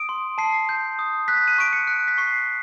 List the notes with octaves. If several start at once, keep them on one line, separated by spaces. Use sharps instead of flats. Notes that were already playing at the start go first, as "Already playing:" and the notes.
Already playing: D#6 D7
C6
A5 C7
G6
D#6
F#6 B6
D#7
C#6 D7
C#7
F#6
B6
C#6 C7